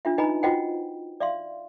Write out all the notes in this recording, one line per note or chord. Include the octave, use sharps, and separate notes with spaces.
D4 F4 E5
D#4 B4 D#5 G#5 A#5 B5
F4 F#4 C5 D#5 F#5 G5
D5 E5 F5 C6